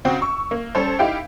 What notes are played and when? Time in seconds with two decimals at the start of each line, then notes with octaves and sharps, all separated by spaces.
0.05 C#3 C4 F#4
0.21 C#6 E6
0.51 A#3
0.75 G3 C#4 A4 C5
0.99 D#4 E4 G4 F5 G5